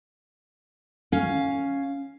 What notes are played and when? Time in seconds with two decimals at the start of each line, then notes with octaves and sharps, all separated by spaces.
1.12 C#4 F5